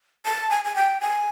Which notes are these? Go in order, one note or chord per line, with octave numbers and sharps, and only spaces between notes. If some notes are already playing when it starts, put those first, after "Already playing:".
A5
G#5
G#5
G5
G#5